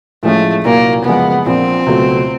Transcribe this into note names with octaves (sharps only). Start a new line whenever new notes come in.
A2 F3 G#3 A3 C#4
C2 A#2 F#3 A#3
F#2 C#3 F3 G#3 B3
A#1 A#2 F3 C4
C#2 B2 F#3 A3